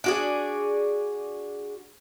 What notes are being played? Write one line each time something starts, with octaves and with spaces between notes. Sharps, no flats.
D4 F#4 G#4